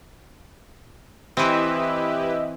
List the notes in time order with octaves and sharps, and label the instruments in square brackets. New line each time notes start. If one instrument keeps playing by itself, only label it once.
[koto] E3 C4 [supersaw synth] E4 G4 B4 [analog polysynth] D#5 E5